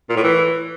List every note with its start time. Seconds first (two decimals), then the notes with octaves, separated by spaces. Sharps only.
0.09 A#2
0.16 A2
0.23 E3